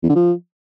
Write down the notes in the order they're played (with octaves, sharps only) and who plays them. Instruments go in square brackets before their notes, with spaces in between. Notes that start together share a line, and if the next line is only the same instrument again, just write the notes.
[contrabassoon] E2
D3
F3